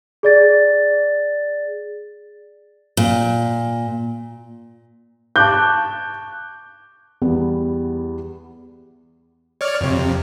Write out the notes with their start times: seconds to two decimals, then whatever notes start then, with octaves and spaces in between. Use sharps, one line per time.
0.23 G#4 D5 A6
2.97 A#2
5.36 A5 C#6 D6 F#6 G6
7.22 E2 E3 G3 B3
9.61 C#5 D5 F6
9.81 F2 C3